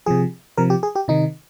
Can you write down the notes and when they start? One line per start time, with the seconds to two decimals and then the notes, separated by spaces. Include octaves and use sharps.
0.06 C3 F3 G#4
0.58 C3 F3 A#4
0.70 G4
0.83 G#4
0.95 G4
1.08 C3 D#3 D#4